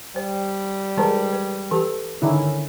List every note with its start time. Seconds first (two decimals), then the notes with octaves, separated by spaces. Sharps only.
0.16 G3 C5
0.98 E3 G#3 A#4 C5 A5
1.33 B4
1.72 E3 G4 A4
2.22 D3 D#3 C#4 E4